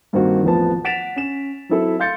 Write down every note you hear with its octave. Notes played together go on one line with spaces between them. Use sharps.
G2 D#3 A#3 C4 F#4
A1 F2 F3 B3 B4 A5
F#5 A6 B6 D7 E7 F7
C#4 E7
F#3 C4 E4 A4
F5 C6 G6 A6 C#7